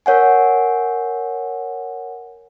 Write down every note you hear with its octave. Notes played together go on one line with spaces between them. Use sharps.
A#4 C#5 F#5 G#5